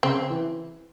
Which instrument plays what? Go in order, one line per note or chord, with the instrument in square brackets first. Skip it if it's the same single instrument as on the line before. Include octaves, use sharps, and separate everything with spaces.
[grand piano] C#3 [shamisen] C4
[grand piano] E3